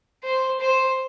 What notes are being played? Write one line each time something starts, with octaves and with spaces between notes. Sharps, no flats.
C5
C5